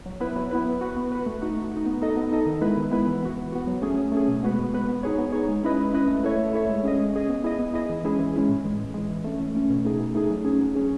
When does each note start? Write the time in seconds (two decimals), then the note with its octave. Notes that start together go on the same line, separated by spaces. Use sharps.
0.06 F#3
0.20 B3 E4 B4
0.36 F#3
0.51 B3 E4 B4
0.66 B3
0.81 F#4 B4
0.96 B3
1.12 F#4 B4
1.26 A3
1.42 D#4 F#4
1.57 A3
1.72 D#4 F#4
1.86 B3
2.02 D#4 A4 D#5
2.17 B3
2.32 D#4 A4 D#5
2.46 D#3
2.61 G#3 B3 E4 B4
2.77 D#3
2.91 G#3 B3 E4 B4
3.07 E3
3.22 B3 F#4
3.37 E3
3.52 B3 F#4
3.67 F#3
3.82 A3 C#4 G#4
3.98 F#3
4.12 A3 C#4 G#4
4.28 B2
4.43 G#3 B3 F#4 B4
4.58 B2
4.73 G#3 B3 F#4 B4
4.88 B3
5.03 D#4 G#4 C#5
5.18 B3
5.32 D#4 G#4 C#5
5.49 G#3
5.63 C#4 E4 B4 D#5
5.78 G#3
5.93 C#4 E4 B4 D#5
6.08 A3
6.23 E4 A4 C#5 E5
6.39 A3
6.53 E4 A4 C#5 E5
6.69 G#3
6.84 C#4 G#4 D#5
6.98 G#3
7.13 C#4 G#4 D#5
7.29 B3
7.44 E4 G#4 D#5
7.59 B3
7.74 E4 G#4 D#5
7.90 E3
8.04 G#3 C#4 E4 G#4
8.19 E3
8.34 G#3 C#4 E4 G#4
8.49 A2
8.64 E3 G#3
8.79 A2
8.94 E3 G#3
9.10 E3
9.24 A3 C#4
9.39 E3
9.55 A3 C#4
9.70 B2
9.85 A3 D#4 G#4
9.99 B2
10.14 A3 D#4 G#4
10.30 F#3
10.45 C#4 G#4
10.61 F#3
10.75 C#4 G#4